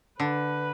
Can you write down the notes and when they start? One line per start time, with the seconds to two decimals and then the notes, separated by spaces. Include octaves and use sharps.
0.20 D3 B4